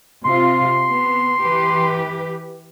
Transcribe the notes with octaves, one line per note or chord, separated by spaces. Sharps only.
C3 F4 C6
B3
E3 G4 B4